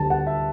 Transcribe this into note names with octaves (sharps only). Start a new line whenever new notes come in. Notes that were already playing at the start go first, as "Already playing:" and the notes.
Already playing: D2 D3 G3 A5
F#5
E5